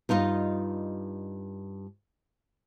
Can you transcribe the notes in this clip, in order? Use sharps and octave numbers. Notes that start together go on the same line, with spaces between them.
G2 D#4 F4 A#4 D#5